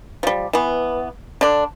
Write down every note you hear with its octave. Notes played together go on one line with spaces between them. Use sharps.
F3 G3
E3 B3
D3 D4